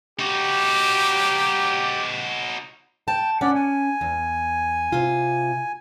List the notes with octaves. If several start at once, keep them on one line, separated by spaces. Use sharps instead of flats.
D#4 F#4 G4
G5 A5
C#4 D5 F#5
G#5
E2
C3 F4